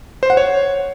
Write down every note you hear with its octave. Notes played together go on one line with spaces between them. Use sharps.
C5
F#5
C#5